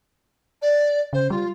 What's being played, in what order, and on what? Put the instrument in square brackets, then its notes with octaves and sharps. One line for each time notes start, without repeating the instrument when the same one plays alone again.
[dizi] D5
[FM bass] C#3 [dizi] C5
[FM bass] G3 [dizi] F4